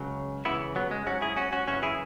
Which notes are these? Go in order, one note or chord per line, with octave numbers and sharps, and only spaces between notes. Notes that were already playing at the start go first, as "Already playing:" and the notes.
Already playing: C#2 C#3 F#3
C#2 C#3 E3 B3 E4
F#3 B3
G#3
G#2 F#3 C#4 F#4
E4 G#4
C#4 F#4
C#4 F#4
F#2 C#3 E3 C#4 F#4
E4 G#4